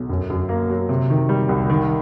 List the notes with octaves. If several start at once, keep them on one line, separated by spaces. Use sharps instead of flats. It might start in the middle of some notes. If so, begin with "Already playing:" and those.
Already playing: B1
F#2
F#2
A#3
F#3
C3
D#3
G3
C2
D#3